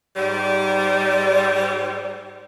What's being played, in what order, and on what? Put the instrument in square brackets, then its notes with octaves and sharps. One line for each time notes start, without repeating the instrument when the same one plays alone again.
[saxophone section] G#2 G3